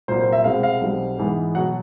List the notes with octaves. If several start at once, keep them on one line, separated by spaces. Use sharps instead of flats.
C2 A#2 F#3 A#3 C5
C5
E5
C2 B2 G#3 C4 F5
F5
B1 B2 G3 C4
G#2 E3 G#3 B3
B2 F#3 F#5